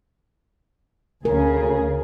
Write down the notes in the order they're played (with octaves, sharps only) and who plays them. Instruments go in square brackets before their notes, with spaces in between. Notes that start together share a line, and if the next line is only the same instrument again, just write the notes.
[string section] D2 C#3 G#4 [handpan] A#4